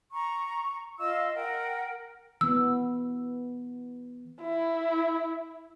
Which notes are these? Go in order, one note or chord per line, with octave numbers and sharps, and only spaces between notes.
A#5 C#6
F4 D#5 F5 E6
A#4 F#5 G5
E3 B3 E6
E4